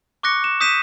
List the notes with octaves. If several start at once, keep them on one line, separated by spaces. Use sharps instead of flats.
C#6 D6 F#6 A#6 C#7
E7
D#6 G6 B6 D#7 E7